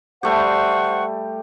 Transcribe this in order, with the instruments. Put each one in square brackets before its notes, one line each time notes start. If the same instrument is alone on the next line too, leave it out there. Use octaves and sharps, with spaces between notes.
[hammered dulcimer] G3 A3 G4 [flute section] C5 F#5 C#6